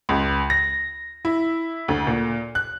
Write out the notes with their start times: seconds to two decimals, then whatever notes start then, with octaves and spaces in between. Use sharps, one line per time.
0.09 C#2
0.50 A#6
1.25 E4
1.88 D2
2.07 A#2
2.55 F#6